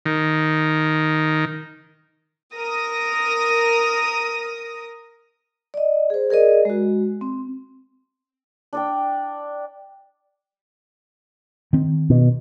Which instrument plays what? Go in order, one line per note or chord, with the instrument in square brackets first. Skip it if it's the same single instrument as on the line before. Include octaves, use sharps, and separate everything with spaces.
[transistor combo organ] D#3
[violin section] A#4 D#6 A#6
[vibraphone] D5 D#5
G#4 C5
G#4 A#4 D5 D#5
G#3 F#4
C4
[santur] D4 D5 G5
[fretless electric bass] D#3 C4
[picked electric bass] B2